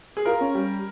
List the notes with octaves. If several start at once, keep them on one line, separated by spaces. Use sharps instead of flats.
G#4
F4 A#4
C#4
G3